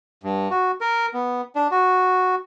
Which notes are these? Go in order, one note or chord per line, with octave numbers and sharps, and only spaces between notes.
G2
F#4
A#4
B3
D4
F#4